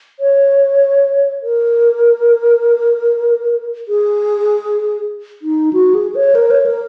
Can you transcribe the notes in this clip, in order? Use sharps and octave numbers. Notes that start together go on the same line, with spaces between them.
C#5
A#4
G#4
D#4
F#4
G#4
C#5
A#4
C#5
A#4